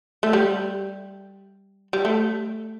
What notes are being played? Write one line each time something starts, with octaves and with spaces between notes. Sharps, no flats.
A3
G3
G3
A3